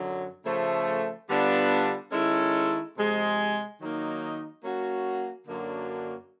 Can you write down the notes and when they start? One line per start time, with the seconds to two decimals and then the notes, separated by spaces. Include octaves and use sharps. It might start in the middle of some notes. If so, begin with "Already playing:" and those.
Already playing: F#2 D3 F#3
0.44 C#3 F3 A3
1.28 D3 G3 B3 D4 F4
2.12 D#3 G#3 C#4 E4 A4
2.95 C3 F3 G#3
3.80 D#3 F#3 A#3 D#4
4.63 F#3 A#3 C#4 F#4
5.47 F#2 D3 F#3 A#3 D4